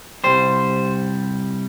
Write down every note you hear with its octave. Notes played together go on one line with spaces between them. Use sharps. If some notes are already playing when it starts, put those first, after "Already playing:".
C2 A#2 G3 C5